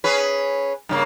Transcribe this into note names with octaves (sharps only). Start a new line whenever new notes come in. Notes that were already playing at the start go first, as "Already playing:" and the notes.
C#4 G#4 B4
G2 C#3 A#3